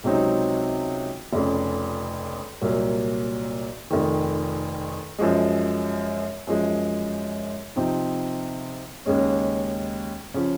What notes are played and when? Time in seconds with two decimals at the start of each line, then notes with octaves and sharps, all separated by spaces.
0.04 C#2 C3 F#3 C4 D#4
1.33 F1 F2 C#3
2.61 C2 A#2 F#3 A#3
3.91 F1 F2 D#3
5.18 F#2 F3 G#3
6.47 F#2 F3 G#3
7.76 C3 F3 C4 D#4
9.05 D#2 C#3 G#3 C#4
10.34 C#3 F3